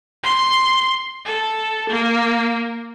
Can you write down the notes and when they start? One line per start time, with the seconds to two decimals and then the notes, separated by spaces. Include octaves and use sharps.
0.23 C6
1.25 A4
1.89 A#3